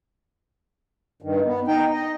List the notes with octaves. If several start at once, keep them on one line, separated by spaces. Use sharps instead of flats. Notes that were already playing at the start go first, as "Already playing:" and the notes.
G2 D#3
B3
D#4 G5
D#5